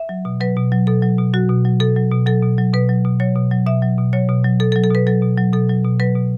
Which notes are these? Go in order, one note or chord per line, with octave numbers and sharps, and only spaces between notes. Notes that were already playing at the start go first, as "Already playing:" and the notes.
Already playing: E5
F#3
B2
F#3 B4
B2
F#3
B2 A4
F#3
B2
F#3 F#4
B2
F#3
B2 A4
F#3
B2
F#3 A4
B2
F#3
B2 B4
F#3
B2
F#3 C#5
B2
F#3
B2 E5
F#3
B2
F#3 C#5
B2
F#3
B2 A4
A4
F#3
A4
B2 B4
F#3 A4
B2
F#3
B2 A4
F#3
B2
F#3 B4
B2